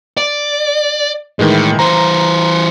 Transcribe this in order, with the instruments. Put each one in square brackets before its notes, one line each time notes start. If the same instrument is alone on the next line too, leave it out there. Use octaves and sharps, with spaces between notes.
[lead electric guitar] D5
[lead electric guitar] A2 [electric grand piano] D#3 E3 G#3
[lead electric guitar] E3 C5 [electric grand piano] A#5